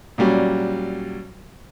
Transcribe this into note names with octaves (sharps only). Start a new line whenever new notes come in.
A#2 F#3 G3 C#4